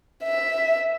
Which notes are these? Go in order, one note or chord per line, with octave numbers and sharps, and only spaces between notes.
E5